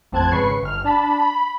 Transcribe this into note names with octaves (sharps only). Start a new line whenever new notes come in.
A1 F2 C4 A5 F#6 G#6
G#1 C#3 B4 C#6 C7
G1 F6
D4 A5 B5
B5